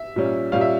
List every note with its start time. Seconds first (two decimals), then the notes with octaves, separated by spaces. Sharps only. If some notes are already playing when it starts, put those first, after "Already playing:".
Already playing: E5
0.16 A#2 G3 C#4
0.52 A#2 G3 C#4 F5
0.61 E5